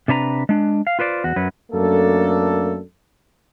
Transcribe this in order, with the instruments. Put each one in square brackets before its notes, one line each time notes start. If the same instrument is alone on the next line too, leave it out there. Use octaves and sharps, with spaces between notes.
[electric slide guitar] C3 D4 B4 A#5
G#3 D4
F5
F4 B4 C5 D5
E2 F#4
F#2 F#3 B4
[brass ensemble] F#2 A3 A#3 D4 A4